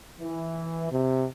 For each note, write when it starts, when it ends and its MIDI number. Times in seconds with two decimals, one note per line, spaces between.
0.20 0.89 52
0.91 1.25 48